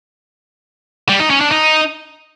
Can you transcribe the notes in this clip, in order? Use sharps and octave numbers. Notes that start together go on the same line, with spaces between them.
G3
D#4
C#4
D4
D#4